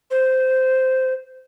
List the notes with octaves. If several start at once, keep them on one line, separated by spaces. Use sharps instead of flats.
C5